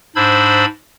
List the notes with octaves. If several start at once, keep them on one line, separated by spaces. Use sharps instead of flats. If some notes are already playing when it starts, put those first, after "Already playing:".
G#2 D4 C5 B5 E6 G#6